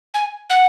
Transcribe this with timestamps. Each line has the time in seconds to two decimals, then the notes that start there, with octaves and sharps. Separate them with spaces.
0.14 G#5
0.50 F#5